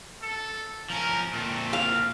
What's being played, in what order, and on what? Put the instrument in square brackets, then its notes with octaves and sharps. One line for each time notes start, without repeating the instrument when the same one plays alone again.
[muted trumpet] A4
[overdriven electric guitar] F3 C#4 [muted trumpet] A#4
[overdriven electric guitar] A#2 C4 [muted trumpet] A3
[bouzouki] F5